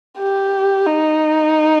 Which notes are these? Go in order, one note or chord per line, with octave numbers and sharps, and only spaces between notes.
G4
D#4